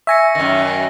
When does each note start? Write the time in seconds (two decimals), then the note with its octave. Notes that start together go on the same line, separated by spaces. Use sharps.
0.07 E5 G#5 C#6 A#6 C#7
0.35 F#2 D#3 A#6